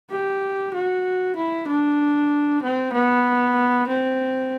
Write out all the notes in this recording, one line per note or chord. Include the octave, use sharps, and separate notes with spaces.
G4
F#4
E4
D4
C4
B3
C4